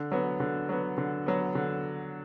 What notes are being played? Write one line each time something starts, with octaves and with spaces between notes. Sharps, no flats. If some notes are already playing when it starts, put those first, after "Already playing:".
Already playing: D3
F#3 B3
D3
F#3 B3
D3
F#3 B3
D3